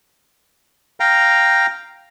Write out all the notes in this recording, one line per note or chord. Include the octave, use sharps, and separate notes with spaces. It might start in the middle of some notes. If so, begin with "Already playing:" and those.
F5 G5 A#5